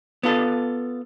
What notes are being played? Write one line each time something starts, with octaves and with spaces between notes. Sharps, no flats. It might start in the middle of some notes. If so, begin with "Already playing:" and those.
B3 F4 A4